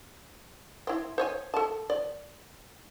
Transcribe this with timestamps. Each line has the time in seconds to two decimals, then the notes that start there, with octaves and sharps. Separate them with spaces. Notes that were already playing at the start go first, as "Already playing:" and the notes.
0.87 C4 E4
1.18 C5 C#5 G#5
1.54 A4 A5
1.90 D5